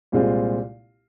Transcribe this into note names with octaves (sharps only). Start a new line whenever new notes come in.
C2 A#2 G#3 C4 F4